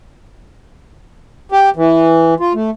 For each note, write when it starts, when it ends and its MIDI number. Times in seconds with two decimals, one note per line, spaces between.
1.52 1.70 67
1.76 2.34 52
2.40 2.53 65
2.55 2.70 57